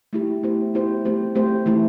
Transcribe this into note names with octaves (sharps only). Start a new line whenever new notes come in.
A3 E4 G4
B3 E4 G4 C5
B3 E4 G4 C5
A3 C4 G4 C5
A3 C4 G4 C5
E3 A3 E4